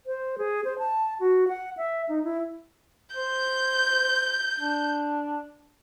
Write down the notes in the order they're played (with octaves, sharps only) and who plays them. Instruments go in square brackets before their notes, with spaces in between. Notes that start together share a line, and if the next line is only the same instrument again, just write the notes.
[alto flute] C5
G#4
C5
A5
F#4
F#5
E5
D#4
E4
[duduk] C5 [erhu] G6
[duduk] D4